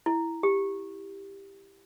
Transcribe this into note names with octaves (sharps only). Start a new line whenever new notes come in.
E4
G4